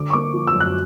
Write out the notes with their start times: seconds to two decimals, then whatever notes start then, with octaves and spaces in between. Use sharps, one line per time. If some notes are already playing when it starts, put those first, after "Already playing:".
Already playing: D3 D6
0.10 C#6
0.13 A#3 D6
0.34 F3
0.47 E6
0.54 F#2
0.60 F#6